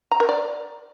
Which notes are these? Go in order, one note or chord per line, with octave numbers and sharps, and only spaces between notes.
A#5
A#4
D5